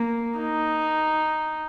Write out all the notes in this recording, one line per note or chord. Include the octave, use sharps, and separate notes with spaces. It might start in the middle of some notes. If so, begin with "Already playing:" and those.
Already playing: A#3
D#4